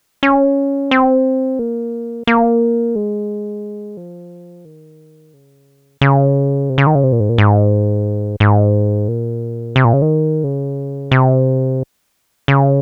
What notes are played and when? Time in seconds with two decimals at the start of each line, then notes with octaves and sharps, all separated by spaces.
0.23 C#4
0.91 C4
1.59 A#3
2.27 A#3
2.96 G#3
3.97 F3
4.65 D#3
5.34 C#3
6.01 C#3
6.70 C3
6.78 C#3
6.87 D#3
6.95 C#3
7.03 C3
7.12 A#2
7.20 G#2
7.29 A#2
7.38 G#2
8.40 G#2
9.08 A#2
9.76 C3
9.85 A#2
9.93 C#3
10.02 D#3
10.44 C#3
11.12 C3
12.48 C#3